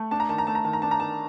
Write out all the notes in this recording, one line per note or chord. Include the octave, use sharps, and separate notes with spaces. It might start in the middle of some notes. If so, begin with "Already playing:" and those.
Already playing: A3
D4 A5
A#5
D#3 A5
A#5
A3 A5
A#5
D#3 A5
A#5
D4 A5
A#5
D#3 A5